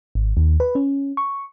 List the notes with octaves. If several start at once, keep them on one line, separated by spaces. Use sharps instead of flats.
G#1
D#2
B4
C#4
C#6